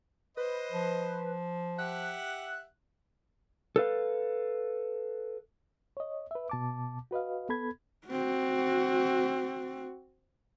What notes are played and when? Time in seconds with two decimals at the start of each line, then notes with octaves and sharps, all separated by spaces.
0.37 B4 C5 D#5
0.72 F3
1.78 G4 E5 F#5 F#6
3.76 A4 B4 F5
5.97 C#5 D#5
6.31 B4 E5
6.50 B2 A5 D6
7.11 F#4 B4 D#5 F5
7.49 B3 A4 B5 G#6
8.07 C4 F#4